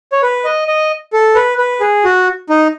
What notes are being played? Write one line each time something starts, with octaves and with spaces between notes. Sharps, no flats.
C#5
B4
D#5
D#5
A4
B4
B4
G#4
F#4
D#4